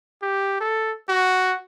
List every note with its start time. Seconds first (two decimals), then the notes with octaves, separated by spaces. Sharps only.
0.22 G4
0.61 A4
1.09 F#4